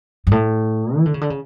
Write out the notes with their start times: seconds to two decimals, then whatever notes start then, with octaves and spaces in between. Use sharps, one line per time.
0.27 G2
0.31 A2
0.97 E3
1.06 D3
1.14 C#3
1.21 D3
1.30 C#3